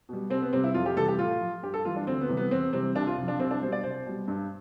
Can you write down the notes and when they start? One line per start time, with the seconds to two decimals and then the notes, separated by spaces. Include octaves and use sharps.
0.09 B2 G3
0.30 C2 C4
0.42 B3
0.53 C3 G3 C4
0.64 E4
0.74 F2 F4
0.86 G4
0.96 C3 E3 G3 A4
1.08 G4
1.19 A2 F4
1.41 F3
1.63 G2 G4
1.74 A4
1.85 E3 G3 F4
1.96 D4
2.07 D2 C4
2.21 B3
2.29 C3 E3 G3
2.37 B3
2.51 E2 C4
2.73 C3 E3 G3 C4
2.95 C2 D4
3.07 F4
3.17 C3 F3
3.28 D4
3.40 C2 C4
3.51 D4
3.62 B2 G3 C5
3.72 D5
3.83 C2 C5
4.06 B2 G3
4.28 G2